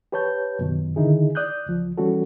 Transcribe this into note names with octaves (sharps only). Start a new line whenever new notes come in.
G4 B4 C#5 A5 G6
F#2 B2 D#3
D3 D#3 D#4 E4 G#4
D5 D#6 F#6 G6
C#2 F3
E3 G3 C#4 F#4 A4